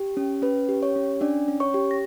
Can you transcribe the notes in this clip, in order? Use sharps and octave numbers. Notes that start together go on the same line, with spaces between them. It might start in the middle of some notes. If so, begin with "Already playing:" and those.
Already playing: G4
C#4
C#4 B4
G4
C#5
C#4
C#4 D4 D5
C#4
C#5 C#6
G4
A#6